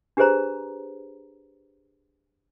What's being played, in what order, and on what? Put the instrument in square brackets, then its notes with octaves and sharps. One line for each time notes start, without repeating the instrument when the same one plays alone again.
[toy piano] D4 G4 G#4 B4 C5 A#5